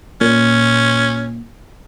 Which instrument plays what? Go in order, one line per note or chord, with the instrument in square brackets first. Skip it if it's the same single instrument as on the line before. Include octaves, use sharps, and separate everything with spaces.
[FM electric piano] A#2 [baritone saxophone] C#4